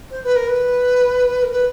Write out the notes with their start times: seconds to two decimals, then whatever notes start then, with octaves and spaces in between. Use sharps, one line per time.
0.11 C5
0.23 B4
0.36 A#4
0.47 B4
1.43 A#4
1.52 B4